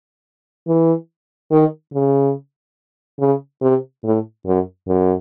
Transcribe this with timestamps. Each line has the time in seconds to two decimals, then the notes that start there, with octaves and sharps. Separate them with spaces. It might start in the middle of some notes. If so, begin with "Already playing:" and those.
0.67 E3
1.51 D#3
1.93 C#3
3.19 C#3
3.62 C3
4.04 A2
4.46 F#2
4.87 F#2